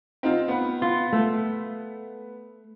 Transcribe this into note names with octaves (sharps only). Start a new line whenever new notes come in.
C4 D#4 F4
B3 B4
F4
A3